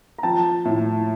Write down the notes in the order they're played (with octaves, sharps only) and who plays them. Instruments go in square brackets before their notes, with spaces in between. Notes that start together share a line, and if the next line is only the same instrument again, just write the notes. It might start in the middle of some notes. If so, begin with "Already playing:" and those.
[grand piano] A#5
F3 G5 A5
A2